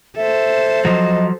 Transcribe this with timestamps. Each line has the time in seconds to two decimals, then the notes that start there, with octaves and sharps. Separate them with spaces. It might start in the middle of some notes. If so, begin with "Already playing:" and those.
0.17 A4 C5 E5
0.85 F3 F#3 D#5